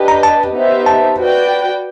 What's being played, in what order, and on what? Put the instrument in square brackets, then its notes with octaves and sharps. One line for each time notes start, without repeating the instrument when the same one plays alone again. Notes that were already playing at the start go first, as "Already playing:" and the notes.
Already playing: [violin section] D4 G4 B4 D#5
[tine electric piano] A#5
A5
[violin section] B3 D#4 G4 C5 E5
[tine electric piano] A5
[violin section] F#4 B4 D5 G5